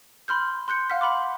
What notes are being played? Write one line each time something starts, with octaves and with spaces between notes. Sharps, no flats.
B5 C6 F6 G6
C6 F#6 G6 C#7
F5 F#5 F6 B6
F#5 B5 C6 D6